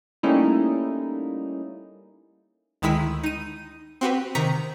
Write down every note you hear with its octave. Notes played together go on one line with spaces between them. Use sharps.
G3 A3 A#3 C#4 D#4 E4
D2 D#3 G#3 E4 E6 B6
D#4 D#7
C4 F#4 G4 B4
C3 D#3 A#5 C#6 B6